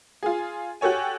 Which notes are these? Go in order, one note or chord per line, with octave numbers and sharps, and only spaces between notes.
F4 G#4
F#4 G4 A4 C#5 G#5